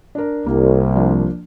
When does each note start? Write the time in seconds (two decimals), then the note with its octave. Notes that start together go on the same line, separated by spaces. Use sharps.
0.15 D4 A#4
0.46 C2 A#3
0.96 F3 A#3 D4